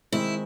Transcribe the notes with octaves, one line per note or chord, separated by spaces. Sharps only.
D#3 G#3 C4 E4